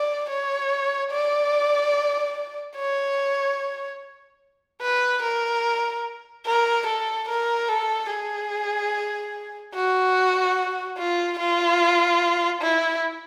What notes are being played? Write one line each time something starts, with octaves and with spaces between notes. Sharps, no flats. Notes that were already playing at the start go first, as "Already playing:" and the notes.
Already playing: D5
C#5
D5
C#5
B4
A#4
A#4
A4
A#4
A4
G#4
F#4
F4
F4
E4